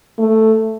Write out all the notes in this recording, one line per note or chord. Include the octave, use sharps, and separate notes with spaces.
A3